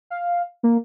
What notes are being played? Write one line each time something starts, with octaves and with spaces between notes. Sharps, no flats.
F5
A#3